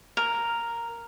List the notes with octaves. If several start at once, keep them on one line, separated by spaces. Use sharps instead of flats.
A#4